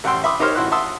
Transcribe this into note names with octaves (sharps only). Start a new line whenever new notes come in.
A1 F#5 G5 C6 E6
E5 B5 C6 D6 D#6
D#4 G4 A#4 C5 C#5 F6
A1 E4 F#4 C6 F#6
E5 F#5 A5 C6 D#6 E6